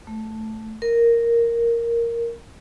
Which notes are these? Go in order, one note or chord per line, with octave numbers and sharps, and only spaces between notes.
A3
A#4